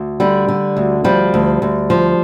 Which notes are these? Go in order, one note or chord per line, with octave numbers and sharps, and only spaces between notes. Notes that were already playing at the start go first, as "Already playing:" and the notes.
Already playing: D2
D3 G3
D3
D2
F3 G3
D2
D2
F3